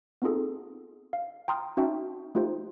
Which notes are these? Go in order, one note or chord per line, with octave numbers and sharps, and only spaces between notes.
B3 C4 D#4 F4 G#4 A4
F5
G5 A#5 C6 D#6 F6
C#4 D#4 F#4 E5 G5 A5
A3 D#4 F4 G4 C5